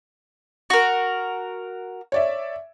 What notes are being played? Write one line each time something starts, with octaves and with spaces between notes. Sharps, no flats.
F#4 A#4
C#5 D5 E5